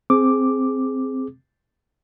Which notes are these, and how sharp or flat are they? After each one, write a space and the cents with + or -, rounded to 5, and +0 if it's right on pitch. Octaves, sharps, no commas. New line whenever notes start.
C4 +0 G#4 +10 D6 +0